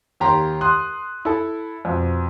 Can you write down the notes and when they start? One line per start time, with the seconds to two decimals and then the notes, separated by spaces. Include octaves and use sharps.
0.20 D#2 G4 A#5 C6
0.61 C6 D#6 F#6
1.25 E4 A4
1.85 F2 B2